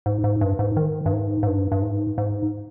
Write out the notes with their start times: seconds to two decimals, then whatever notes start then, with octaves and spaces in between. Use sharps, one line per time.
0.06 G#2
0.24 G#2
0.41 G2
0.59 G#2
0.77 D#3
1.06 G2
1.13 G#2
1.43 G#2
1.47 G2
1.72 G2
1.82 G#2
2.18 G#2